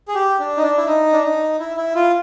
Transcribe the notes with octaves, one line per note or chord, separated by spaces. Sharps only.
G#4
G4
D4
D#4
D4
E4
D#4
D4
D#4
E4
E4
F4